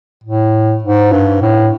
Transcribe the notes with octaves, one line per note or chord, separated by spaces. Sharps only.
A2
G#2
G2
A2